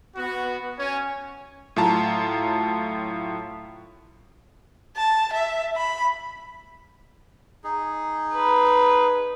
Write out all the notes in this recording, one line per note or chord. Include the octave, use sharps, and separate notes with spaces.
B3 F#4
C#4 C#5 G#5
A2 F#3 F4 A5 A#5
A5
E5
B5
D#4 G#4
B4